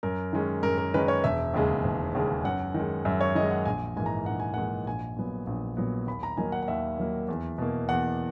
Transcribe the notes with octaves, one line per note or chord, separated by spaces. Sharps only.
F#2 A#4
D#3 G#3 C#4
F#2 A#4
A#4
D#3 G#3 C#4 B4
C#5
E1 E5
D#2 C#3 G#3
E1
D#2 C#3 G#3
F#2 F#5
D#3 G#3
F#2 E5
C#5
D#3 G#3 D#5
F#5
A#1 G#5
G#2 E3 A#3 G#5
A#5
A#1 F#5
G#5
G#2 E3 A#3 F#5
A#1 G#5
A#2 F#3 B3
A#1
A#2 F#3 B3
D#2 B5
A#5
D#3 F#3 A#3 G#5
F#5
F#5
D#2 E5
D#3 F#3 A#3
E2
B2 A#3
E2 F#5